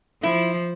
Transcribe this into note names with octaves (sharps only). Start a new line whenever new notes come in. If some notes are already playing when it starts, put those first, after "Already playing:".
F3 E4